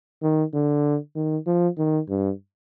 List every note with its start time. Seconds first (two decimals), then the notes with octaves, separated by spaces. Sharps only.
0.22 D#3
0.53 D3
1.16 D#3
1.47 F3
1.78 D#3
2.09 G2